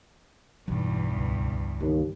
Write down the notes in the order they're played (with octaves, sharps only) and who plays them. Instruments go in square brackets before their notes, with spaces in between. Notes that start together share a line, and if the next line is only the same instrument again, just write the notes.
[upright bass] B1 [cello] E2 G2 [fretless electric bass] E3 F#3
[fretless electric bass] C#2
[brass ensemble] D#2 [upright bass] E3